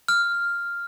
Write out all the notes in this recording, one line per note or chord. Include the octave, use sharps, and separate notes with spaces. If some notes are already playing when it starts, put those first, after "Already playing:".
F6